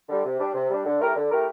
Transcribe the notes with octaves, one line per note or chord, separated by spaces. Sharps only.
D3 G3
C3
G3 D4
C3
G3 D4
D3
A3 E4 G4 A#4
D3
A3 E4 G4 A#4